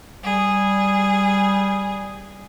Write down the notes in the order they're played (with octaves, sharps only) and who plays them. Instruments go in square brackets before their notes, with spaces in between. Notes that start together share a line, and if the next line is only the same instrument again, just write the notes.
[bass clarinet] G3 [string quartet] G#4